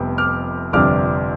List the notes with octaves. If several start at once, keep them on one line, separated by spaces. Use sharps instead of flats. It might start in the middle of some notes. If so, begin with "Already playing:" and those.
Already playing: F1 F2 C3 G3 B3
D6 F6
G1 F2 C3 G3 D4 D6 F6